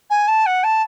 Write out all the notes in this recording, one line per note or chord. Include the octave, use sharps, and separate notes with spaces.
G#5
A5
F#5
A5